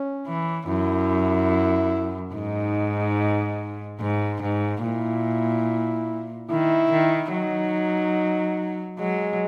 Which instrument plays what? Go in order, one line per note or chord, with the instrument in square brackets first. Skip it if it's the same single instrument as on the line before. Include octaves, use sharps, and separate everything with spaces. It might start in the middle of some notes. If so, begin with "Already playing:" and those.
Already playing: [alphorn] C#4
[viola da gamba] E3
[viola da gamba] F#2 [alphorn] E4
[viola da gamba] G#2 [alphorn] D#4
[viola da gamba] G#2
G#2
[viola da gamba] A#2 [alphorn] E4
[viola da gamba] D#3 [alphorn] E4
[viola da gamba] D#3
[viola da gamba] F#3 [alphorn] D#4
[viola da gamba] F#3 [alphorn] G#3